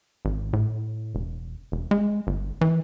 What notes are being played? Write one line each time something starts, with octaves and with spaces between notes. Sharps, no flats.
G#1
A2
E1
E1
G#3
G1
E3